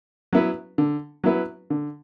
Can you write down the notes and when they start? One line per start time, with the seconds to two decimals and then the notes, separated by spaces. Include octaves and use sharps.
0.33 F#3 B3 E4 B4
0.78 D3
1.24 F#3 B3 E4 B4
1.70 D3